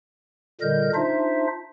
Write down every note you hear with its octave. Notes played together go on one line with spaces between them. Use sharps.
A#2 D3 G3 A#4 D#5 G6
D4 D#4 F4 C5 E5